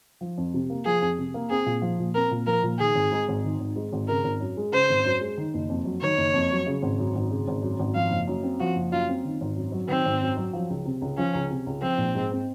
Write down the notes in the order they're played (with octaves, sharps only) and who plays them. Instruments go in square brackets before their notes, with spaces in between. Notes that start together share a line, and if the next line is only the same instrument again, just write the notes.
[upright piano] F3
F2
C3
A#3
[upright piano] F3 [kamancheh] G#4
[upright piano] F2
C3
A#3
[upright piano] C4 [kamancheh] G#4
[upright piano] A#2
F3
A#2
[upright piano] C4 [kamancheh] A#4
[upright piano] A#2
[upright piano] F3 [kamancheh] A#4
[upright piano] A#2
[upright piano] D#3 [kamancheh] G#4
[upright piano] G#1
G#2
G#1
D#3
G#1
G#2
G#1
[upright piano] C#3 [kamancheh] A#4
[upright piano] G#1
F#2
G#3
[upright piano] C#3 [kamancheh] C5
[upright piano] G#1
F#2
G#3
D#3
F#1
F2
F#3
[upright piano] D#3 [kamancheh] C#5
[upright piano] F#1
F2
F#3
C#3
G#1
F#2
G#1
C#3
G#1
F#2
G#1
[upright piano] F3 [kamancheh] F5
[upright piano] F#1
F#2
C4
[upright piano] F3 [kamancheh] F#4
[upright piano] F#1
[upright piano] F#2 [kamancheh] F4
[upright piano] C4
D#3
G#1
F#2
F#3
[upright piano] D#3 [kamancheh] C4
[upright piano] G#1
F#2
F#3
F3
C#2
C3
C#2
[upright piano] F3 [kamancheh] C#4
[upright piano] C#2
C3
C#2
[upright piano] F3 [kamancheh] C4
[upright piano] A#1
G#2
C4